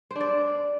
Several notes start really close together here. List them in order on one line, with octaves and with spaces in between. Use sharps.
C5 D4 D5